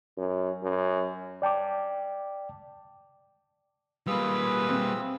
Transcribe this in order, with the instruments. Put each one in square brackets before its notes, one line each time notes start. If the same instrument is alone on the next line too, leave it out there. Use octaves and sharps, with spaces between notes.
[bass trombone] F#2
F#2
[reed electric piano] D5 G5 A5 D6
[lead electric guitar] G3 A#3 [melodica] F4 G#4 E6 [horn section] B4
[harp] C4